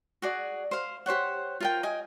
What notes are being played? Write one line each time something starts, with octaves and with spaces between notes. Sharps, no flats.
F#4 G#4 D5
C5 F5
G4 C5 C#5 F#5
F4 A#4 G5
D#5 G5 G#5